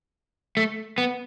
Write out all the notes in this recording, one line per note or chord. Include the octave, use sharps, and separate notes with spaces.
A3
B3